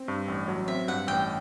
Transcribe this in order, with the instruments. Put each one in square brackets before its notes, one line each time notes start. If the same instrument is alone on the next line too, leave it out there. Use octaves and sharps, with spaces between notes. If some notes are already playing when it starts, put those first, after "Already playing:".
Already playing: [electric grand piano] C4
G2
A1
F#3
[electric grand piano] C4 [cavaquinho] E5
[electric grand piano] G2 [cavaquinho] F#5
[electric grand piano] A1 [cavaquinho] G5